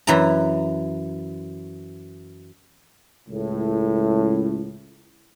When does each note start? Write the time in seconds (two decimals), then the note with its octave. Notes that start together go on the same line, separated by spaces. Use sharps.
0.07 F#2 E3 A#5
3.29 C#2 A2